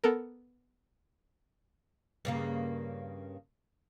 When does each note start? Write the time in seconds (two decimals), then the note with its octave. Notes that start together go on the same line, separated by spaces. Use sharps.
0.04 B3 A4 A#4
2.25 G2 C#3 A#3